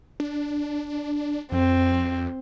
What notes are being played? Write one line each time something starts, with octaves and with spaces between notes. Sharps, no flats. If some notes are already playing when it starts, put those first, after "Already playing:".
D4
F2 C4